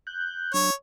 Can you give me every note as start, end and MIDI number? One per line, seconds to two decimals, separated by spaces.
0.07 0.53 90
0.07 0.53 91
0.54 0.70 54
0.54 0.70 62
0.54 0.72 73